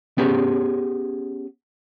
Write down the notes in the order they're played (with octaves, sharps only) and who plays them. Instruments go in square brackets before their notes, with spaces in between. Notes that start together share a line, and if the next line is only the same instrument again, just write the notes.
[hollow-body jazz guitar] B3 C#4 G4 G#4